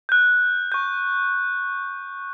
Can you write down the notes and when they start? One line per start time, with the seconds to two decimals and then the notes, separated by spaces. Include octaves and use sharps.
0.09 F#6 G6
0.72 C#6 G6